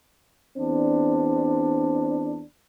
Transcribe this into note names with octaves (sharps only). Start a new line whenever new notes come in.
E2 C4 D4